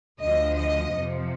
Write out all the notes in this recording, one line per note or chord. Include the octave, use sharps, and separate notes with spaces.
D2 D3 F3 D#5
D#5
F2 C3 F3